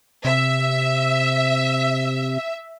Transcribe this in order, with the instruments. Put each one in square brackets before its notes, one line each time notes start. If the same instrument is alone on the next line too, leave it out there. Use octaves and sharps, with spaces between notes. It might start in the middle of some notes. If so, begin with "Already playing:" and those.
[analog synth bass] C3 [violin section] E5